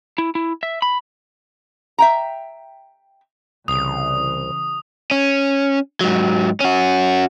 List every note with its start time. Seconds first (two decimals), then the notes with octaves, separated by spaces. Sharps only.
0.18 E4
0.35 E4
0.63 E5
0.82 B5
1.98 E5 G5 A#5
3.68 C2 C#3 E3 D#6
5.11 C#4
6.01 G#2 F#3
6.60 C#4 F#4